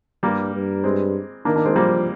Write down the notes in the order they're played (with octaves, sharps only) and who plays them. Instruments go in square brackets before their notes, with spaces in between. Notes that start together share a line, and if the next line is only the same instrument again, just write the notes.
[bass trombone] G2 [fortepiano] G3 A#3
[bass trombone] G2
[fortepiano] G#3 C4
[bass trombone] D#3 [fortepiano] A#3 D4
[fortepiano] A#3 D4
G#3 C4
[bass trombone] F3 [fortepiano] G3 A#3